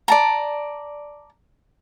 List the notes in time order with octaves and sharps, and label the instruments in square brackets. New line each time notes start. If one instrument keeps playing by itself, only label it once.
[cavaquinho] D5 A5 A#5